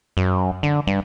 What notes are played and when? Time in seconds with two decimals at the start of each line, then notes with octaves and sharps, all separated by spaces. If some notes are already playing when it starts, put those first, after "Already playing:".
0.17 F#2
0.63 D3
0.87 G2